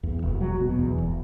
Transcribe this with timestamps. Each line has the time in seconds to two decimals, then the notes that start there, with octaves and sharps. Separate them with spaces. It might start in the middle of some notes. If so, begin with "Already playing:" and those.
0.03 E2
0.22 E1
0.41 F#3
0.61 B2
0.79 E2
0.98 E1